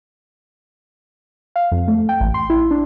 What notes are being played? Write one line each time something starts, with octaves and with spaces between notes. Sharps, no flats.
F5
F2
A3
G5
A1
C6
E4
D4